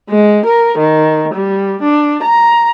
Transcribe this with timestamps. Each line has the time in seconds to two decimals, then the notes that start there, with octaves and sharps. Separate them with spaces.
0.10 G#3
0.46 A#4
0.77 D#3
1.35 G3
1.82 D4
2.23 A#5